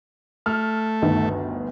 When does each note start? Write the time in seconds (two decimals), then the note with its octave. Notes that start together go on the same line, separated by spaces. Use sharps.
0.46 A3 F6
1.02 G1 D2 D#3